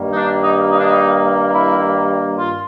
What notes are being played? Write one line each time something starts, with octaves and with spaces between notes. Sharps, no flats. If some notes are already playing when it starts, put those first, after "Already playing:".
Already playing: G2 D#3 G3 A#3
D#4
D4
D#4
D#4
D4
D#4
E4
F4